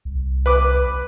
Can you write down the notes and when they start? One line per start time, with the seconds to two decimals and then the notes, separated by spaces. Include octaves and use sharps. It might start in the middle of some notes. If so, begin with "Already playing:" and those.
0.05 C2
0.46 B4 D6